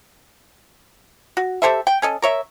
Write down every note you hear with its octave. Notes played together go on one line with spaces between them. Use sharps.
F#4
G4 A4 C5 E5
G5
C#4 A4 D#5
A#4 C#5 E5